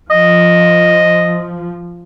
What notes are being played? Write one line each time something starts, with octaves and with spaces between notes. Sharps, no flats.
F3 D#5